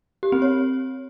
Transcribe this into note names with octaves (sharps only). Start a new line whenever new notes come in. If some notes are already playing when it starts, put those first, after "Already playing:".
G4
C4
C#5